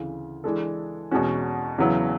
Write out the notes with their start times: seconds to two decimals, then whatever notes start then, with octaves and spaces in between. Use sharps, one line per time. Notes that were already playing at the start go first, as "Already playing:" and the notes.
Already playing: D2 C#3 E3
0.44 E3 G#3 D4 A4
1.11 E2 B2 G#3 C#4 F#4
1.78 E2 C#3 F#3 B3 E4